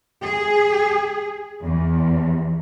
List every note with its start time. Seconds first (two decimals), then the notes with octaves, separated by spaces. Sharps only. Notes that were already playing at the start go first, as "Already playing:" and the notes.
0.21 G#4
1.62 E2